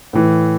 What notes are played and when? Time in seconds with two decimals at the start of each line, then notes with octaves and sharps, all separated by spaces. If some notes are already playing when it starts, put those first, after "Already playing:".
0.13 A2 E3